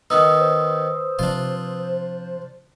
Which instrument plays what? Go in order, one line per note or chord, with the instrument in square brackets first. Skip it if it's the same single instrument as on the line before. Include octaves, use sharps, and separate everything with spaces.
[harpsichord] D#3 B3 D#4 [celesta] B4 D#6 E6
[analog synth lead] C5
[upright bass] C3 F3 [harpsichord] D4 F4